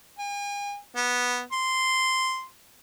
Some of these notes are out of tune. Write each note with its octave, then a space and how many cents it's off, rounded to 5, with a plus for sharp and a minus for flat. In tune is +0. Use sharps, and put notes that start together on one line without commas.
G#5 -40
B3 -5
C6 -5